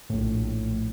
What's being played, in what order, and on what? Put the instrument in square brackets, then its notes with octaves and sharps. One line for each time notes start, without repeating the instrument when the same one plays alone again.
[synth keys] A#1 A2